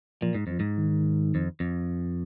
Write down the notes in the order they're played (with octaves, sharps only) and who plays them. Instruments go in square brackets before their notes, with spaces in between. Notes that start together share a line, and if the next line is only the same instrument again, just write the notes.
[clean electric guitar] A#2 [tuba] F3
[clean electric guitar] G#2
[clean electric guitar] F2 [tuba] F3
[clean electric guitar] G#2
[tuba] D#3
[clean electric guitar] F2
F2